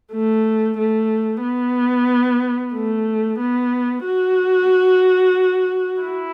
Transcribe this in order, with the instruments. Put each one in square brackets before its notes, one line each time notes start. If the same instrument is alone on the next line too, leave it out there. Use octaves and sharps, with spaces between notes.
[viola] A3
A3
B3
A3
B3
F#4
E4